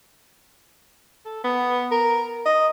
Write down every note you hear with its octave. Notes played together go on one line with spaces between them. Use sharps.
A4
B3
A#4
D#5